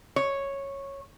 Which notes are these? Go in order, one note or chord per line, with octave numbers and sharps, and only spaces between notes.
C#5